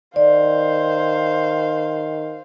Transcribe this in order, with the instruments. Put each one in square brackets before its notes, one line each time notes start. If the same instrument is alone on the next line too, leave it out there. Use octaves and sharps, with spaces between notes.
[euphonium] D#3 [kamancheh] C5 F5 [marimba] D5